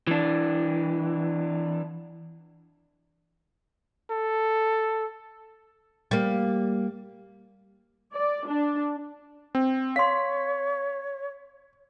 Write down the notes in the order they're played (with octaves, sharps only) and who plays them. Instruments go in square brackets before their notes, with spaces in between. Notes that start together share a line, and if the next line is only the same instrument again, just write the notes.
[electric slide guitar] E3 D4
[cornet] A4
[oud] G3 A#3
[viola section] D5
D4
[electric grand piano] C4
[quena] C#5 [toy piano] F5 C6 [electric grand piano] B6